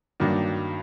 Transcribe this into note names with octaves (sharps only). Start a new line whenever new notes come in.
G2 D#3 F#3 A#3 D4